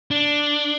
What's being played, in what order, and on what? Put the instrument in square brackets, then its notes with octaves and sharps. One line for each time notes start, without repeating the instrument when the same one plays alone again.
[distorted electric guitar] D4